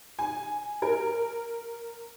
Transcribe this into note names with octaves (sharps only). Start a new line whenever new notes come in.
G#5
A#4